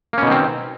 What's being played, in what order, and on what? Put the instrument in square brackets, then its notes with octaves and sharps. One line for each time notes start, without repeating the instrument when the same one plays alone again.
[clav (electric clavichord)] A#3
C#4
B2
D#3
C4